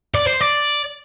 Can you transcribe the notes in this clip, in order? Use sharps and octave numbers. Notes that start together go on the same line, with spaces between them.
D5
C5
D5